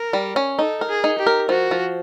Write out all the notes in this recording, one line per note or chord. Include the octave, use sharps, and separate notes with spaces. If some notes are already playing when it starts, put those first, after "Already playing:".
Already playing: A#4
G3
C#4
D#4 A4
A#4
G#4
D#4
G4
A#4
F3 F#4
F3